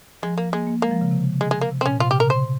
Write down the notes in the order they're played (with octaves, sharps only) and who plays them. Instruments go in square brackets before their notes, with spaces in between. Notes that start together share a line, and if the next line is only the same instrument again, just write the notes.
[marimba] F3 [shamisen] G#3
[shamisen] A#3
[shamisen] G#3 [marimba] A#3
[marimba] A#3
[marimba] G#3 [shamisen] A#3
[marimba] F3
C#3
C3
[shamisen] G#3
G#3
A#3
[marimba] C3
[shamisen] C4
[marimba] A#2 [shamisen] C#4
[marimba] C3 [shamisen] F4
[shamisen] G4
[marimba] C#3 [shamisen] A#4
[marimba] C3 [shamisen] C5